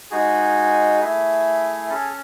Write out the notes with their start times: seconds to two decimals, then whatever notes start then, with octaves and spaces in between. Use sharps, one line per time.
0.11 G#3 D#4 F#4 G#4
1.01 A3 E4 G#4
1.89 C#4 G#4 A4